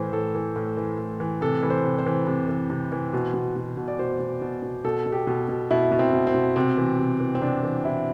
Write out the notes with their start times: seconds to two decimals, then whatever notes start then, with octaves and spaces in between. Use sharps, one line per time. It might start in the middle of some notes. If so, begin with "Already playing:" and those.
Already playing: A2 E3 C5
0.12 A2 A4
0.35 E3
0.56 A2
0.77 E3
0.99 A2
1.20 E3
1.41 C3 A4
1.62 E3 B4
1.70 C5
1.84 C3
1.99 C5
2.06 E3
2.27 C3
2.48 E3
2.70 C3
2.92 E3
3.13 B2
3.34 B2
3.56 B2
3.77 B2
3.88 D5
3.99 B2 C5
4.20 B2
4.42 B2
4.62 B2
4.84 B2 A4
5.06 B2
5.12 G4
5.27 B2
5.49 B2
5.71 B2 E4
5.91 B2
5.99 C4
6.13 B2
6.27 C4
6.34 B2
6.56 C3 C4
6.77 E3
6.98 C3
7.20 E3
7.35 C4
7.41 C3 D4
7.63 E3
7.84 C3 E4